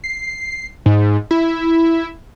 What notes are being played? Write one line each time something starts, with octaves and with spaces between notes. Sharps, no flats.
C7
G#2
E4